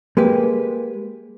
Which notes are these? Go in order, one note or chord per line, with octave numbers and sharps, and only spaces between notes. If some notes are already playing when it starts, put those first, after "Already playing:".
G#3 A#3 G4 B4